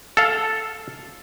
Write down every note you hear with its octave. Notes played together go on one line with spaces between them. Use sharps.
A4 F5